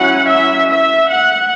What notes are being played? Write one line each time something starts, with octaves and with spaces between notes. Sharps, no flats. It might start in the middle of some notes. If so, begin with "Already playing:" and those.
Already playing: F#3 C#4 E4 F#5
E5
E5
F#5